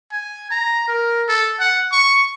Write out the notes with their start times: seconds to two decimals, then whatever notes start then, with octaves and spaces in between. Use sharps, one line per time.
0.12 G#5
0.51 A#5
0.88 A#4
1.28 A4
1.60 F#5
1.92 C#6